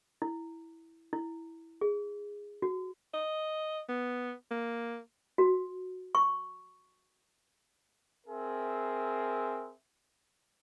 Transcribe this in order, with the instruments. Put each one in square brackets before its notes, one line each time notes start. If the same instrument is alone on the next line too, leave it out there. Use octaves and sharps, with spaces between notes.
[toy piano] E4
E4
G#4
F#4
[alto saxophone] D#5
B3
A#3
[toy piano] F#4
C#6
[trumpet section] C4 G#4 A#4 E5